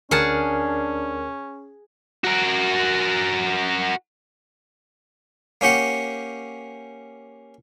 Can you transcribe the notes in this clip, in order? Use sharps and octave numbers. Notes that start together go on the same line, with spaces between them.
D2 C#4 D4 G#4 A#4 F#5 A5 F6
F#4 A#4
A#3 C#4 G4 F#5